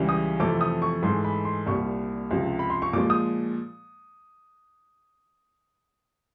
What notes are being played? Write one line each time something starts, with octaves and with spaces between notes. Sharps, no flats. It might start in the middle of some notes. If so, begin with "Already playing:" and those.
Already playing: C#2 C#3 E3 G3
D#6
F2 C3 E3 A3 D6
D#6
C#6
G#2 E3 A3 C6
B5
C6
C2 A#2 G3 C#6
C#2 C3 F3
B5
C6
C#6
A#2 F3 G#3 D6
D#6